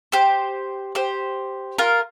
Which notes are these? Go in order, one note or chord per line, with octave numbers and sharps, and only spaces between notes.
G4 C5
G4 C5
F4 A#4